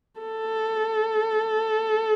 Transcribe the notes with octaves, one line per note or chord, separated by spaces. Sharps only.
A4